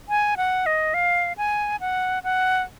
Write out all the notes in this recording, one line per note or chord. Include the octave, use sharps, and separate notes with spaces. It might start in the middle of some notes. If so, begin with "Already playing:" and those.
G#5
F#5
D#5
F5
G#5
F#5
F#5